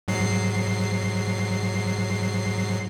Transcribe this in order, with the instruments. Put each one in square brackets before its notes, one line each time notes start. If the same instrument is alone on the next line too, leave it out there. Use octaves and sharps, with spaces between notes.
[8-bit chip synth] G#2 F#3 C7